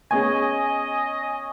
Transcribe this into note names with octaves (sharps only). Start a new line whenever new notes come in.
B3 C#4 G#4 D#5 G#5 C#6